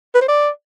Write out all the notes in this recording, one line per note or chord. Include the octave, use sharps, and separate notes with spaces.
B4
C5
D5